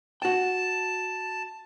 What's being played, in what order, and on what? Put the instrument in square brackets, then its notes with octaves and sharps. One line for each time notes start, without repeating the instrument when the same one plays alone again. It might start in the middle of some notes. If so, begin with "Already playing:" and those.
[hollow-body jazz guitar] F#4 G5 [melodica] A5